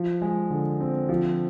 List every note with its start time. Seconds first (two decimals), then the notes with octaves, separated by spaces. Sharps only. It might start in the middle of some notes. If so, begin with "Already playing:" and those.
Already playing: F3
0.22 G#3
0.50 D3
0.80 C4
1.09 F3